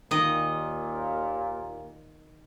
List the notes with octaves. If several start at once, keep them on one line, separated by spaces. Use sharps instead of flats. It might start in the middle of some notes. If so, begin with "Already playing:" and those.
D#2 A#2 D#3 D#5